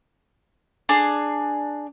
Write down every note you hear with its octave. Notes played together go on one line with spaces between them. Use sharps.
D4 G#4